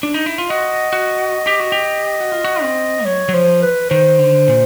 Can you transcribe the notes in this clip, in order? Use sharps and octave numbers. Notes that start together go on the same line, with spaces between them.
D4
D#4
E4
F4
F#4 D#5
F#4
G4
F#4
G4
F#4
F4
F#4
C4
F#3 C#5
F#3
F3 C5
B4
D#3 C5
D3
A#2